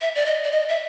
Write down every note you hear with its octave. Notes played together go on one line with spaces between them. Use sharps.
E5
D5
D#5
D5
D#5
E5